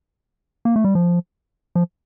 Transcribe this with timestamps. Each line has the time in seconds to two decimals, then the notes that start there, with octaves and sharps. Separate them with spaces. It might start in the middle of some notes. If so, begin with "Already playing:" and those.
0.65 A#3
0.76 A3
0.84 G3
0.95 F3
1.75 F3